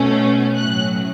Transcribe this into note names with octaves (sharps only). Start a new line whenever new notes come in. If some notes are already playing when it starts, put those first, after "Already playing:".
Already playing: B2 A3 C#4
A2 F#3 C#4 F#6